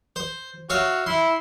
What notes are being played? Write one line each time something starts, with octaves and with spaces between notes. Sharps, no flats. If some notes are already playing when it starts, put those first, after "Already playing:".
C5
F#4 C#5 E5 F5
E4 C6